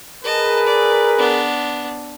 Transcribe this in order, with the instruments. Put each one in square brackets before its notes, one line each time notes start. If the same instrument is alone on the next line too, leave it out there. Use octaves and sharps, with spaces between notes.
[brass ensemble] G#4 A#4 B4 [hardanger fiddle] D#5 A5
[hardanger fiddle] D5
B3 D4